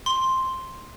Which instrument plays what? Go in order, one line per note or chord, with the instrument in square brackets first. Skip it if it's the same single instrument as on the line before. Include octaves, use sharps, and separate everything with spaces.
[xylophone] C6